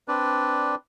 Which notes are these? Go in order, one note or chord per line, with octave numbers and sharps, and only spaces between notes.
C4 D4 B4 D5